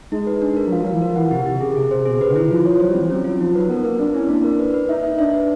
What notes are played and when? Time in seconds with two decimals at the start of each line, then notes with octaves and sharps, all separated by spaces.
0.12 G#3 D#4
0.27 B4
0.42 D4
0.57 A#4
0.67 F#3
0.72 F3 F5
0.82 F#3
0.87 F5
0.92 E3
1.02 F3 A#4
1.16 E3 F#5
1.31 C3 G4
1.46 C3 G4
1.61 C#3 G#4
1.76 C3 G#4
1.91 C3 C5
2.05 B2 G#4
2.20 C#3 B4
2.31 D3
2.36 D#3 E4
2.51 F3 F4
2.65 C#5
2.80 F#3 C5
2.90 G3
2.95 E3 C4
3.09 F#3 C#4
3.24 F#3 F4
3.40 F3 D#4
3.55 F#3 B4
3.69 B3 A#4
3.84 A#3 A#4
3.99 C4 D4
4.14 C#4 E4
4.29 A#3 D4
4.44 A#4
4.59 B4
4.74 B4
4.89 D#4 E5
5.03 E5
5.19 D4 E5
5.34 B4